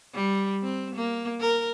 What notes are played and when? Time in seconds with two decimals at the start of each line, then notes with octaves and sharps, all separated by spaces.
0.14 G3
0.62 C4
0.95 A#3
1.41 A#4